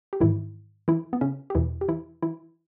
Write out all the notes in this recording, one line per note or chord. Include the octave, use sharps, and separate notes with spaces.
G4
G#2 D#3 E3 E4
E3 E4
B3
C#3 C#4
G4
E2 B2 E3 E4
G4
E3 E4
E3 E4